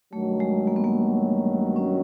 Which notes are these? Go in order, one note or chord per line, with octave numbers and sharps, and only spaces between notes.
G2 D#3 F#3 A3
G#3
A#3
B3
A#3
C#4